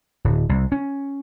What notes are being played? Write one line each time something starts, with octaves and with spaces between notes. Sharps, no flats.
D1
C2
C#4